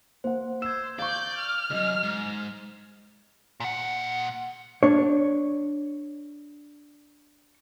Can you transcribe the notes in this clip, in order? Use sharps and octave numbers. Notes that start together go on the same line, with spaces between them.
A#3 C5 F#5
C5 E6 G#6 E7
D5 F5 C#6 G6
F6
C#2 F#2 D#5
G#2
A#2 F#5
D4 C#5